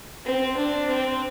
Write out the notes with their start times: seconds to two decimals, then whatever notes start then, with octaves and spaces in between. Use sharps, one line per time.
0.25 C4
0.56 D4
0.88 C4